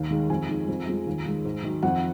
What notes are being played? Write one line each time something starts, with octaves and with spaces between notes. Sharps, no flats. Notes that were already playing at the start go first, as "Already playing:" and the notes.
Already playing: D#2
D#3 G#3
F2 G#5
D#3 G#3
F2
F3 G#3
D#2
D#3 G#3
G#2
D#3 F#3
F2 F#5